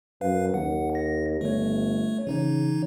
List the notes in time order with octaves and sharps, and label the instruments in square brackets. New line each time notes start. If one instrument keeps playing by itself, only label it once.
[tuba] F#2 [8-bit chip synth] B4 F5
[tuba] D#2 [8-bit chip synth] F#5
[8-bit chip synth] A#6
[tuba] G1 [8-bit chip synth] A3 C#5
[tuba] C#3 [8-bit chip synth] E3 D#4 C#5